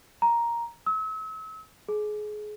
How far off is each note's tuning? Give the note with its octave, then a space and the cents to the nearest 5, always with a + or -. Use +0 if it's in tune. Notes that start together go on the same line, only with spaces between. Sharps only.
A#5 +5
E6 -40
G#4 +25